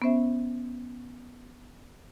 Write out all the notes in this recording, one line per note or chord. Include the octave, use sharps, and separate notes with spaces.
B3 C#4 C5 E5